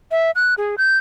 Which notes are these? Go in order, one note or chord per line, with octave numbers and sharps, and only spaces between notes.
E5
F#6
G#4
G6